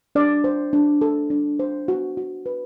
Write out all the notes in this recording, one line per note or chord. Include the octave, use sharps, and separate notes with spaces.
D4 D5
C5
D4
A4
D4
C5
F#4
F#4
B4